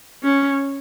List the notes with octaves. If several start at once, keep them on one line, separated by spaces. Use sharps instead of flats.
C#4